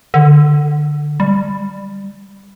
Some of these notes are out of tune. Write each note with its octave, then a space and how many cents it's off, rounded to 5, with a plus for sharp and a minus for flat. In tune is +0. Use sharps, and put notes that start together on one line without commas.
D3 +15
G3 +15